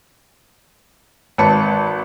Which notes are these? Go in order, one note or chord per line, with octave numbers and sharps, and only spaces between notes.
G#1 B4 A5 B5 C#7